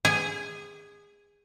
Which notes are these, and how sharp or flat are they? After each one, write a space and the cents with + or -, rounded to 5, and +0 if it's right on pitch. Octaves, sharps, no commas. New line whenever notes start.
G#4 -25 G#5 +0